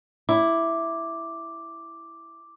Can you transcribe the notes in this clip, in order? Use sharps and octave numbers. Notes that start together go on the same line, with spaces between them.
E4 D6